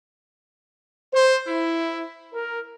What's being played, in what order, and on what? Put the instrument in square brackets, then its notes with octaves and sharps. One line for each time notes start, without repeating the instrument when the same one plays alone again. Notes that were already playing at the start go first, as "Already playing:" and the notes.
[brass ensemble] C5
E4
A#4